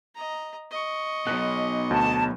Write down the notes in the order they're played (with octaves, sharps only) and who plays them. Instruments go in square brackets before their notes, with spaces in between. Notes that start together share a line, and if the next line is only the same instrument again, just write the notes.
[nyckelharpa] D#5 A#5
D#5 C#6
[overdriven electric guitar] B1 B2 [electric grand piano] F#6
[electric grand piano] D2 [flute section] A5